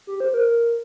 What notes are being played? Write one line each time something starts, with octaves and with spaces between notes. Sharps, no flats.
G4
C5
A#4